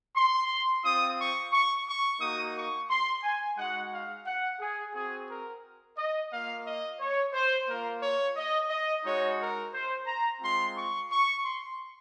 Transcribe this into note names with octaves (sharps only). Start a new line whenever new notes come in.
C6
C4 F4 D#6
C#6
C#6
C#6
A#3 D#4 F#4 D#6
C#6
C6
G#5
G#3 D#4 F#4 F#5
F5
F#5
G#4
C4 F#4 G#4
A#4
D#5
A#3 F4 F5
D#5
C#5
C5
A#3 F4 A#4
C#5
D#5
D#5
G#3 D#4 F#4 C#5
A#4
C5
A#5
G#3 C4 F4 C6
C#6
C#6
C6